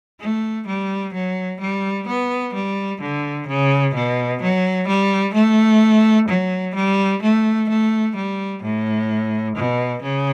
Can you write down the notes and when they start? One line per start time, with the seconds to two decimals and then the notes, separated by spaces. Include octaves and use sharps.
0.20 A3
0.67 G3
1.13 F#3
1.60 G3
2.07 B3
2.54 G3
3.01 D3
3.48 C#3
3.94 B2
4.42 F#3
4.87 G3
5.34 A3
6.28 F#3
6.75 G3
7.22 A3
7.69 A3
8.16 G3
8.63 A2
9.56 B2
10.02 C#3